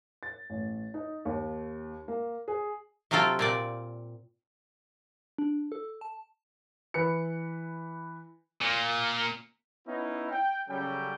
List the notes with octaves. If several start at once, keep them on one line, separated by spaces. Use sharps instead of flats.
A6
A1
D#4
D#2
A#3
G#4
C3 F#3 C4 F4 A4 G5
A#2 C4 D5
D4
A4
A5
E3 B4 C#7
A#2
B3 C#4 D#4 E4
G5
C#3 F#3 G3 C#4 A4 G5